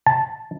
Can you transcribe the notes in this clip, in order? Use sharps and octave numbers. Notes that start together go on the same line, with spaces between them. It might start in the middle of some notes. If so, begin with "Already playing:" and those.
A5